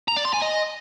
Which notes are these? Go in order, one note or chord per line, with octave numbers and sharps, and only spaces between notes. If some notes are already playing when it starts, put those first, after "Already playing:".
A#5
D5
C6
G#5
D#5